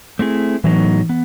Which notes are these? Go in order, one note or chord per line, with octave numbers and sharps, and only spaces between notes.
A3 C4 E4 G#4
A2 E3 F#3 B3 D#4
B3